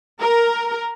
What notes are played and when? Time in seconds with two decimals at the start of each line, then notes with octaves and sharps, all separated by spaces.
0.19 A#4